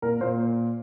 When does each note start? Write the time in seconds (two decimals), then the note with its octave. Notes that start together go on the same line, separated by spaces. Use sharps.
0.02 A#2 A#4
0.21 A#2 C5